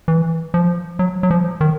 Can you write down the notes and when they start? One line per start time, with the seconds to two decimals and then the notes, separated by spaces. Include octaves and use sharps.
0.08 E3
0.54 F3
0.99 F#3
1.23 F#3
1.31 F3
1.61 D#3